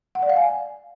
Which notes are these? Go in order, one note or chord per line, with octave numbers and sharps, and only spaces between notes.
F#5
D5
F5
G#5